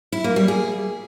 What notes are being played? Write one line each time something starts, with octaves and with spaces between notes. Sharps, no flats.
E4
A#3
G3
G#4